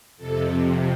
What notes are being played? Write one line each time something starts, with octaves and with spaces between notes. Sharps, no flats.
F2 C3 A4